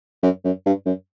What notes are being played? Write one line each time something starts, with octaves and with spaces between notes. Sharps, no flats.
F#2
F#2
G2
F#2